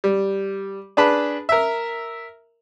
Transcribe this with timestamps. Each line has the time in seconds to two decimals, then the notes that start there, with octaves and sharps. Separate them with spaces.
0.04 G3
0.97 D4 G#4 B4 A5 B5
1.49 A#4 E5